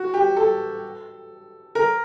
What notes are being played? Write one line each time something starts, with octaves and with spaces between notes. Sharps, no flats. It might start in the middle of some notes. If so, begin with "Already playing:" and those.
Already playing: F#4
G4
A4
A#4